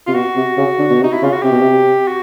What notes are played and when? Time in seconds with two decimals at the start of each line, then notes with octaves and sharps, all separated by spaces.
0.06 C3 F4
0.15 B2 F#4
0.36 C3
0.57 C#3
0.78 D3
0.90 B2
1.00 C3
1.03 D#4
1.13 E4
1.22 C#3 F4
1.33 F#4
1.43 C3 G4
1.52 B2
1.61 C3
2.07 F#4